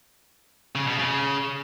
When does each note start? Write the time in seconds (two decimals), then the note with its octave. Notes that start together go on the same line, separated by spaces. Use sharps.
0.75 C#3
0.87 B2
0.98 C#3